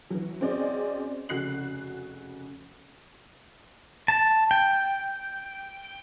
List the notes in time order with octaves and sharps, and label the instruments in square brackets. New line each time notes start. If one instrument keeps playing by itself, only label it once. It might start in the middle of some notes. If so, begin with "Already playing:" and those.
[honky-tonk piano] E3 F#3
C4 C#4 F#4 G#4 D5 D#5
F1 C#3 F#4 F#6 C7 F#7
[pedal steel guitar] A5
G5